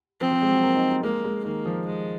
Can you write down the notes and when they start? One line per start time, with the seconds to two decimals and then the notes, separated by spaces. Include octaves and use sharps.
0.20 F3 C4
0.31 F3
0.42 G#3
0.51 F#3
0.63 A#3
0.75 D#4
0.90 D#4
1.03 G#3 A#3
1.24 G#3
1.44 D#3 A#3
1.66 F3
1.86 G#3